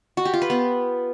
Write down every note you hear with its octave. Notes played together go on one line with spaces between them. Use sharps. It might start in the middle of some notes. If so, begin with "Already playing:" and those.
F#4
G4
F4
B4
B3